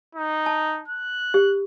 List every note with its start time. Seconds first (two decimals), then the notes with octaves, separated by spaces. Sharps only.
0.15 D#4
0.46 A5
0.88 F#6
1.34 G4